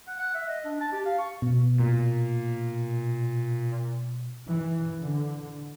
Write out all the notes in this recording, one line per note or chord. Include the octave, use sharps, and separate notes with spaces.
F#5
F#5
E5
D#5
D4
A5
G4
F5
C#6
B2
A#2
E3
D3